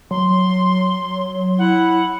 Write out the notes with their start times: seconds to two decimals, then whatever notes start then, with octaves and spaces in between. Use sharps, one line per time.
0.11 F#3 C6
1.59 E4 F#5